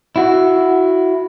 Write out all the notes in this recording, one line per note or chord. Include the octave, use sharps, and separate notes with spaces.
E4 F#4